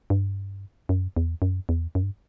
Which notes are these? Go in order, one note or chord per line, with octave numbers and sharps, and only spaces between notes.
G2
F#2
E2
F#2
E2
F#2
G2